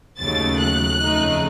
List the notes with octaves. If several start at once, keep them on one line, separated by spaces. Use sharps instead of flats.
D#2 C#3 F#3 A3 A6
F#6
F2 C#3 A3 D#4